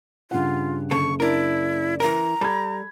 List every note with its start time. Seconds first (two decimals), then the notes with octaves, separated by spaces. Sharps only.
0.31 G2 C#3 F4 F#5
0.91 F#1 D3 A4 C#6
1.20 D4 E4 A#4
2.00 E3 A#4 A#5
2.41 G3 A4 B5 G#6